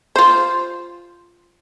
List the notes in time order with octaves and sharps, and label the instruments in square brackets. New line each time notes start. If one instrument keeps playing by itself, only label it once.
[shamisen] F4 C5